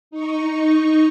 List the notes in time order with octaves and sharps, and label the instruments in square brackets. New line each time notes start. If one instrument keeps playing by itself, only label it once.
[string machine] D#4 C#6